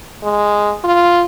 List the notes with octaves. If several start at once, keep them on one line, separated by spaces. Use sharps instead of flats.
G#3
F4